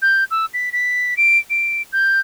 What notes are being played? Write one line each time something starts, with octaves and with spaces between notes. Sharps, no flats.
G6
E6
B6
B6
D7
D7
G6